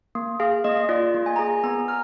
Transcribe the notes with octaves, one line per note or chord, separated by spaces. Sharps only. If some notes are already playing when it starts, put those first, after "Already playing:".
A#3
G#4 F5
A#3 D#5
F4 D5
A#3
G#5
G#4 A#5
G#5
B3 A#5
F6